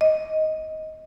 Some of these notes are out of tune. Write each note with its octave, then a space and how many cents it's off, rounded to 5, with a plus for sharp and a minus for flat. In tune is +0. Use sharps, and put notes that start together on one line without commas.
D#5 +15